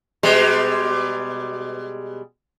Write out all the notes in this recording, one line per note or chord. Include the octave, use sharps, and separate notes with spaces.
B2 G3 G#3